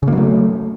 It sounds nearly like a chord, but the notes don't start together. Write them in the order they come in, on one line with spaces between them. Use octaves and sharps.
C#3 A#3 F#3 A3